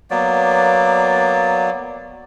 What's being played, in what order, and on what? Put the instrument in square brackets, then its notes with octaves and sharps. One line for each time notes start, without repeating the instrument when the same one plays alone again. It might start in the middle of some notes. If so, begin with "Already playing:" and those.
[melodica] F#3 A#3 B3 D5